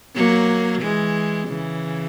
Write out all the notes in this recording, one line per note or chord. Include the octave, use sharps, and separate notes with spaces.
F#3 A#3
E3 G#3
C#3 E3